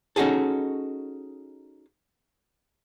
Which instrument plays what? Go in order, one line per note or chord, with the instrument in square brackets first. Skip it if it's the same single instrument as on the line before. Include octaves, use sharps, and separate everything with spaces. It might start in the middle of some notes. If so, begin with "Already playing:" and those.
[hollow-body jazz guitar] C#4 D#4 F#4 G#4 A4